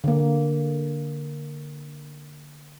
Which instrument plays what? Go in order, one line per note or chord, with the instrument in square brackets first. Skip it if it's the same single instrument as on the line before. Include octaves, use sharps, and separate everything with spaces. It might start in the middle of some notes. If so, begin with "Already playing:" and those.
[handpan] D3 A#3